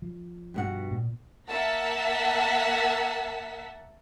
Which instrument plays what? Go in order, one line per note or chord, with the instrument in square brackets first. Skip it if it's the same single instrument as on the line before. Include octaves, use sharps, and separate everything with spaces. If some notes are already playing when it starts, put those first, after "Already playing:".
[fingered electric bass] F3
[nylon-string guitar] G2 B2 F#5
[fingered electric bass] A#2
[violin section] A#3 E5 F#5 A5 B6